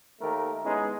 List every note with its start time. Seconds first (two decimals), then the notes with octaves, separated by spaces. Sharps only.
0.21 D#2 A3 A#4
0.65 G#3 B3 C#4 D#4 E4 G#4